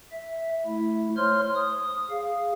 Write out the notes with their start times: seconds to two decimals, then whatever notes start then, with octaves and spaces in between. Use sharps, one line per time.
0.12 E5
0.66 A3 E4
1.17 C5 C#5 C6 F6
1.55 D#6
2.10 G#4 F5